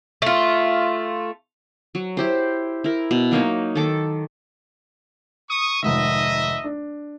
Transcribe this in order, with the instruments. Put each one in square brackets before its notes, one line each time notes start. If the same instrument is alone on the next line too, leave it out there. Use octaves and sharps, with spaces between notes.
[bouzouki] A3 F4
[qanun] F#3
E4 G4 C5
E4 A#4
B2
F#3 A#3 D#4 C#5
D#3 A4 D6
[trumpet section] C#6 D#6
[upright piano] F1 G#2 D#3 [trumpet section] D#5 E5
[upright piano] D4